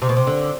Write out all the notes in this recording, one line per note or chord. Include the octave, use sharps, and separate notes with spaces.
C3
B2
C3
D3